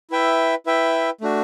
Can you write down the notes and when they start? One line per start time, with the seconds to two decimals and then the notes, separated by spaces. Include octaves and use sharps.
0.11 E4 B4 E5 G5
0.66 E4 B4 E5 G5
1.21 A3 D4 F#4